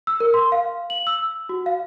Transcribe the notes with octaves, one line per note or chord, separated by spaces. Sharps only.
E6
A#4
C6
F5
F#7
E6
F#4
F5